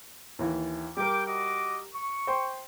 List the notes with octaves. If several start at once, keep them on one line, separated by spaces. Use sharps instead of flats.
D#2 E3
G3 A#4 G5 D6
F#4 D#5 D6
C#6
C5 G5 C6